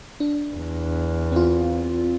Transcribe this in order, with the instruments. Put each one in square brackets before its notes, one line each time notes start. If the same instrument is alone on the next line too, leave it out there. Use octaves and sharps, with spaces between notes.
[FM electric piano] D4
[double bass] E2
[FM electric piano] C4 F4